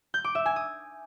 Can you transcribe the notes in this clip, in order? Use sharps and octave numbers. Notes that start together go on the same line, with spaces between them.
G6
D6
E5
G#5
D#6